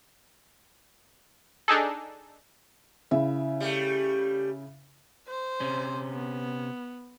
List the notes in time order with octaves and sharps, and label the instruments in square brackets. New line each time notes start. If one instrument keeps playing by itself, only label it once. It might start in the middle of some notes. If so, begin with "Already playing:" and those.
[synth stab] D4 D#4 G#4 A4
[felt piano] C#3 E4 E5
[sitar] G3 A3
[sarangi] C5
[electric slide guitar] C3 C#4
[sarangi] B3